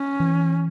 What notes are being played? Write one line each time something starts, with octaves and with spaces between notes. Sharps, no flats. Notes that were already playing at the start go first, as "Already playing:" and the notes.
Already playing: C#4
E3